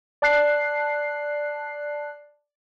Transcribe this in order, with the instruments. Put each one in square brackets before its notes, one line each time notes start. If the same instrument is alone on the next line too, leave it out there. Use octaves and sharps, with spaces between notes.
[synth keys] D5 A5 F#6 C7